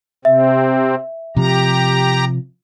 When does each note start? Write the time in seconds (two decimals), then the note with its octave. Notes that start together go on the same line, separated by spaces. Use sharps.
0.25 C3 C4 E5
1.37 C3 F3 G4 A#5